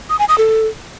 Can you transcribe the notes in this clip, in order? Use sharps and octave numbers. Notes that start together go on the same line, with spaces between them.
D#6
G#5
D#6
A4